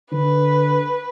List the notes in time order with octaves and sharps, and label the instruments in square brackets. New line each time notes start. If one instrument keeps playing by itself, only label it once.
[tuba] D3 [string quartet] B4